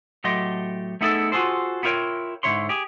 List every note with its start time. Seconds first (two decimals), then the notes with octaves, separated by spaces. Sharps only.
0.24 A2 F#3 A3 G4 D#5 C6
1.01 A3 B3 D#4 E4 G#4 A4
1.32 F4 F#4 G#4 A4 C5
1.83 B3 E4 F4 A#4 C#5 G5
2.43 G#2 D3 E3 E4 C#5 C6
2.69 G4 G#4